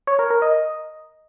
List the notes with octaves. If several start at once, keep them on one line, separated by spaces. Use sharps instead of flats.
C#5
A#4
A#4
D#5